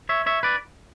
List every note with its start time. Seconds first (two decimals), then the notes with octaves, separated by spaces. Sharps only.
0.09 C#5 E5
0.26 C#5 E5
0.43 B4 D5